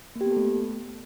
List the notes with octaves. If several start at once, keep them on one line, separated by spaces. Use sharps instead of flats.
A#3
G4
B3
A4
A3